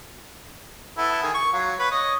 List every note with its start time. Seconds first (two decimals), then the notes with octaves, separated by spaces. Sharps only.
0.98 B3 E4 A4
1.23 D#3 G#4
1.34 C#6
1.53 F#3 F4
1.79 B4 C#5
1.91 C#5 D#5